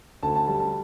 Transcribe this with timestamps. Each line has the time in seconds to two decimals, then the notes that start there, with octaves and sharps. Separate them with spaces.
0.23 D2 A5
0.35 A5
0.47 G3 A5
0.60 A5